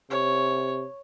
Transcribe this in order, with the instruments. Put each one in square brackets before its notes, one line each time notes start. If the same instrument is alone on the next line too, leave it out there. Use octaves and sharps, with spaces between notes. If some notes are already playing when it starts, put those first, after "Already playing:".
[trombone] C3 [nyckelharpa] C#5